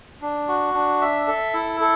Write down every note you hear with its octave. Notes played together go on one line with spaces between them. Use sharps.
D4
F#4
D4
E5
A4
E4
A4